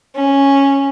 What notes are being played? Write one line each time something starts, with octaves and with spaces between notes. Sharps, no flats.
C#4